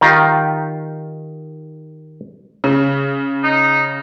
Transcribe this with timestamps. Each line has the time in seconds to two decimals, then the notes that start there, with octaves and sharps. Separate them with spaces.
0.01 D#3 D#4 F4 G4
2.64 C#3
3.44 D#4